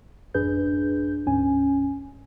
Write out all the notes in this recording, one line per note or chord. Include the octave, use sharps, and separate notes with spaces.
A1 F#2 D4 G#4 B4 G6
D2 G#2 C#4 G#5